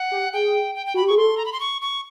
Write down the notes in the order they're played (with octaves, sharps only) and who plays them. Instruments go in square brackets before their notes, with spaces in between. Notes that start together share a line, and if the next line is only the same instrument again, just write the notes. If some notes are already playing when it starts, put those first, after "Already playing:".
Already playing: [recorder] F#5
[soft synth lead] G4
[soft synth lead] G#4 [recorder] G5
[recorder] G5
G5
[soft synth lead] F#4 [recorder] B5
[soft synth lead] G4
[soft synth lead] G#4 [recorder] C#6
[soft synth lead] A4 [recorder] C6
[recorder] A#5
B5
C6
C#6
C#6